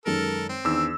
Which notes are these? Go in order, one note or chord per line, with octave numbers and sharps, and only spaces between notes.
F#2 D#3 G#3 A4 A#4
C4
E2 D#3 D4 E6